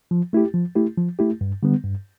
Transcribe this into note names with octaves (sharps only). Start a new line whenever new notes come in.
F3
A3 E4 G4
F3
A3 E4 G4
F3
A3 E4 G4
G2
D3 G3 B3
G2